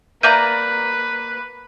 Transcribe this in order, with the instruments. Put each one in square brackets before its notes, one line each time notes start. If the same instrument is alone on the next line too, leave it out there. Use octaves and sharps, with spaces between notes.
[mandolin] A#3 D5 A#5 [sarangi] B4 [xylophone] E5 G6 D#7